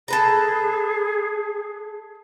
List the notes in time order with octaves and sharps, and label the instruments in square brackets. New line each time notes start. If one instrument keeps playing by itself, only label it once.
[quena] G#4 [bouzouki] A4 B4 A#5